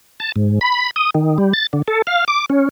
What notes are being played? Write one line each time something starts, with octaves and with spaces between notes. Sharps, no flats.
A5
G#2
B5
D#6
D#3
G3
A6
D3
A4
F5
D6
C#4